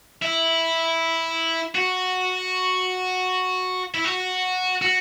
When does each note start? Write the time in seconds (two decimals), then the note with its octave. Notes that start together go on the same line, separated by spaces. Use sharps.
0.22 E4
1.75 F#4
3.94 E4
4.05 F#4
4.82 F#4